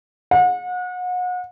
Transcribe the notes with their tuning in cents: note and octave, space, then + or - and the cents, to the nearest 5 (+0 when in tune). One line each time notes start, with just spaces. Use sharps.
F#5 -35